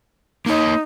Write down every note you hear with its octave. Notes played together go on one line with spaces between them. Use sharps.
A#3 D#4 C#5